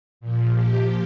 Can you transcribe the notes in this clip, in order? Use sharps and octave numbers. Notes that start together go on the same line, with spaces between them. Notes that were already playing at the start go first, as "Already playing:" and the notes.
A#2 F3
G4